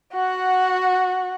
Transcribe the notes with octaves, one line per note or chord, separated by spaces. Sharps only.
F#4 F#5